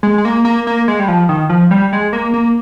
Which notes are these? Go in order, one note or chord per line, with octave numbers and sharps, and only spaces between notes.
G#3
G#3
A#3
A#3
A#3
G#3
G3
F3
D#3
F3
G3
G#3
A#3
A#3